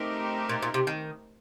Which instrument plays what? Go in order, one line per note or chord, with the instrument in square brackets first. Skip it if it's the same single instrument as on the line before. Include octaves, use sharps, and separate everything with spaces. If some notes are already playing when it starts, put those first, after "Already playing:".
Already playing: [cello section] A3 C4 D#4 G4 A#4
[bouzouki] A#2
A#2
C3
D#3